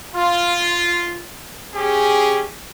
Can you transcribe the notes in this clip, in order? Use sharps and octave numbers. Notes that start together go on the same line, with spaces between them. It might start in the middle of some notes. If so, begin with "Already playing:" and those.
F4
C#4 G4 G#4